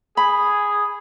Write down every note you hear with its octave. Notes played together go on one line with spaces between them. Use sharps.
G#4 B5